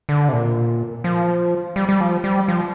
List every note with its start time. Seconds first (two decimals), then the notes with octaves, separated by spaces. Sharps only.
0.09 D3
0.29 C3
0.33 A#2
1.04 F3
1.76 G3
1.89 G3
2.01 F3
2.24 G3
2.48 F3